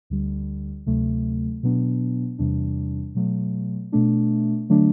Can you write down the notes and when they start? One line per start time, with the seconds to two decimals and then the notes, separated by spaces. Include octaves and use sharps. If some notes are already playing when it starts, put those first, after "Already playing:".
0.10 D2 D3 G3
0.86 D2 C3 F#3 A3
1.63 B2 F#3 B3 D4
2.39 E2 C3 E3 G3 D4
3.15 B2 F#3 A3
3.92 B2 A3 D4
4.69 D3 F#3 A3 D4